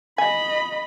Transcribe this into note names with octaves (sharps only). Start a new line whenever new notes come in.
D#5 G#5 B5